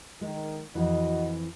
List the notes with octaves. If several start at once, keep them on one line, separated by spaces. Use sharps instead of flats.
D#3 G#3
F2 E3 F#4 D#5